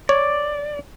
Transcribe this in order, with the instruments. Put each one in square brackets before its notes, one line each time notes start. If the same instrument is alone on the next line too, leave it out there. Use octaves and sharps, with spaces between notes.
[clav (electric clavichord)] C#5 [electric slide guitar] D5